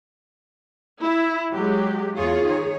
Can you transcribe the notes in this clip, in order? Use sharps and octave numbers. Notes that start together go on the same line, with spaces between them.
E4
F#3 G#3 G4
E2 F4 G#4 C#5
D#3 C#5